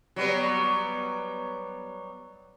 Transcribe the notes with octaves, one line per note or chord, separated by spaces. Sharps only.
F#3 G3 B3